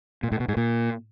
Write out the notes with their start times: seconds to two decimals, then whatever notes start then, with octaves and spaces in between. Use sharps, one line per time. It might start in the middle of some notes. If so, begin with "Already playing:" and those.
0.23 A#2
0.32 A2
0.40 B2
0.48 G#2
0.57 A#2